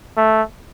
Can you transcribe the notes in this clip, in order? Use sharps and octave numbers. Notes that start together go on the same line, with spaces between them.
A3